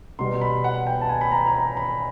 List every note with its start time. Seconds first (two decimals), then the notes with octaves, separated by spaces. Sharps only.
0.19 B2 G3 B3 C6
0.41 B5
0.64 F#5
0.87 G5
1.01 A5
1.09 G#5
1.21 B5
1.32 A#5
1.47 A#5
1.54 B5
1.77 B5